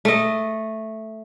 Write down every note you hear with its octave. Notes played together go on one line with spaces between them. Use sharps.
A3 D#5